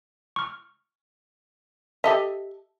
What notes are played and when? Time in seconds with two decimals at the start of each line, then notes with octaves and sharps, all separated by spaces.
0.36 C#6 F6
2.04 G4 A4 D#5 E5